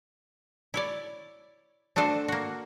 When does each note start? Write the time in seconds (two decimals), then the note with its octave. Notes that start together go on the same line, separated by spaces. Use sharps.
0.74 E4 C#5 D5
1.96 A3 D4 F#4 A4 C5
2.28 A#3 F#4